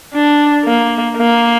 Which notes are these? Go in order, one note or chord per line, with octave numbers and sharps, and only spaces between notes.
D4
A#3
A#3